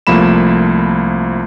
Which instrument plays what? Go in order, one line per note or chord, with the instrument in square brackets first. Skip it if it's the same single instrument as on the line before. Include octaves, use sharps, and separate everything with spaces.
[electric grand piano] C2 F3 A3 A#3 B5 E7